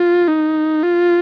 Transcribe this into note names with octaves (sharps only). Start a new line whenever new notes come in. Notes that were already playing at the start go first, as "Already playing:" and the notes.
Already playing: F4
D#4
F4